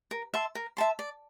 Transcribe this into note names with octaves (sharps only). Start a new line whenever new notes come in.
A#4
E5 A5 C6
A#4
E5 A5 C6
D5